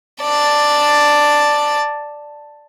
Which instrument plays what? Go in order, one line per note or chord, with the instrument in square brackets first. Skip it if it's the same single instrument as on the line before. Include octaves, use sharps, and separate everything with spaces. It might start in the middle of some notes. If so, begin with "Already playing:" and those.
[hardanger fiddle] D5 A5